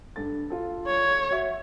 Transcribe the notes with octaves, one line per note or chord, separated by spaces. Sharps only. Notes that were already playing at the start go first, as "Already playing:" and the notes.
G2 A4 A6
F4 A4
C#5
F#4 E5